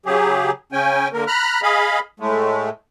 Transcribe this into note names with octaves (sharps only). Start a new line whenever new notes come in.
C#3 F#3 G4 G#4
C#3 C#4 G5 G#5
D3 A#3 A#4
A#5 B5 F6 F#6
G#4 D#5 F5 B5
A2 G#3 A3